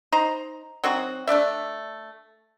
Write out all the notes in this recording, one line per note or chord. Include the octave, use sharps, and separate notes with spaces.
D#4 C5 A#5
F#3 C4 D#4 F#4
A3 D4 D5 E5